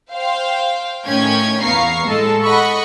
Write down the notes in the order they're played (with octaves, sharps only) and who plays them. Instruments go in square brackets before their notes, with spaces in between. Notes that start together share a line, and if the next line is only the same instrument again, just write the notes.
[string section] C5 F5 G5
A2 D#3 C#4 G5 G#6
E2 B3 F5 A#5 C#6 C7
A2 G#3 A4 A5
D#5 F#5 B5 C#6